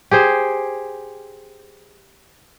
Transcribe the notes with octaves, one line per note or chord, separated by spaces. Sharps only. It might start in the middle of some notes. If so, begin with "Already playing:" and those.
G4 G#4 C5